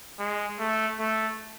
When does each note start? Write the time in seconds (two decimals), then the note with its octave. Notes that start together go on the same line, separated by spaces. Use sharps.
0.19 G#3
0.59 A3
0.99 A3